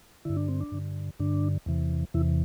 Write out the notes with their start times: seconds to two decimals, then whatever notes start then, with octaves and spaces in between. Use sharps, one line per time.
0.25 G2 D3 E4
0.37 D4
0.48 C4
0.61 D4
0.72 G2 D3
1.20 G2 D3 D4
1.66 E2 C3 E3
2.14 E2 C3 E3 E4